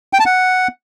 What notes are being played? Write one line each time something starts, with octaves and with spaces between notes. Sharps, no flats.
G5
A5
F#5